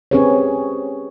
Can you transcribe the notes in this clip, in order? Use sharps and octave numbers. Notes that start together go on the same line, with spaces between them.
C4 C#4 G4 G#4 B4 C#5